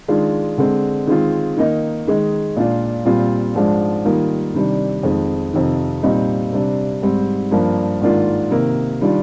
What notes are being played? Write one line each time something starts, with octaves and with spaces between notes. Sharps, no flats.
D#3 G#3 D4 F4
D3 G#3 C4
D#3 G#3 C4 F4
D#3 A#3 D#4
D#3 G#3 D#4
A#2 G#3 D4 F4
A#2 G3 C4 F4
G#2 F3 G#3 D4
D#3 G3 A#3 F4
C3 D#3 G3 D4
F2 D#3 G#3
F2 C3 D#3
A#2 G3 C4 D#4
C3 G3 D4
G#2 G3 C4
G2 F3 A#3 D4
G#2 D#3 A#3 D4 F4
C3 D#3 A#3
D#3 G3 D4 F4